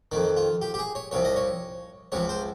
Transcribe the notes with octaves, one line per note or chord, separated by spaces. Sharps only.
F2 D#3 D#4
F4
G4
G4
G#4
C#5
C2 C3 F3 C#5
D#5
C#5
C#2 C3 F3 C#5
C5